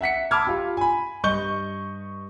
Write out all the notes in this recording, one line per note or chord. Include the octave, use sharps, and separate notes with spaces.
E5 F#5 B6 C#7
A5 B5 D6 E6 F6 G#6
F4 G4
G#5 B5
G2 D#5 C#6 G6 G7